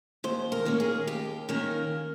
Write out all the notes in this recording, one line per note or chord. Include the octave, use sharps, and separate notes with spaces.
D#2 C5
A#4
D#3 A#3 C#4
G#4
D#2 G4
D#3 A#3 C#4 A#4